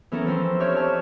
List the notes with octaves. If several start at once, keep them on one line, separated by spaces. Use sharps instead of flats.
E3 B3 C#4 A4 A#4
F3 C4 C6
D4 G4 C#5 E5 F6 G6
C#5 D5 G#5 A5